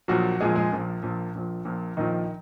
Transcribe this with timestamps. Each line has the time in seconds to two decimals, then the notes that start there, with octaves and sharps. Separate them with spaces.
0.08 A#1 A#2 F3 F#3 F#4
0.41 A#1 A#2 F3 G#3 G#4
0.55 G#3 G#4
0.72 A#1 A#2 F3
1.03 A#1 A#2 F3
1.34 A#1 A#2 F3
1.65 A#1 A#2 F3
1.97 A#1 A#2 D#3 F3 D#4